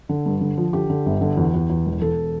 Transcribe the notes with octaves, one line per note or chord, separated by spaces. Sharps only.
D3
G2
D3
F3
D3 G4
D3
G1
D3
E2
E2
E2
E1
E1 A4